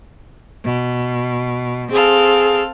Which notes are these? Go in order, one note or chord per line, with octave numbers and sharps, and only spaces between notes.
B2
C4 G#4 A4 F5